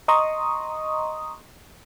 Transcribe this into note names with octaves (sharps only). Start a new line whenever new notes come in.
D#5 A#5 C6 C#6 D#6